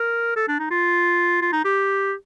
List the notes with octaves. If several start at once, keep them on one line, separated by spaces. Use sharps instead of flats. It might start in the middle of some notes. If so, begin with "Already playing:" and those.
Already playing: A#4
A4
D4
D#4
F4
F4
D#4
G4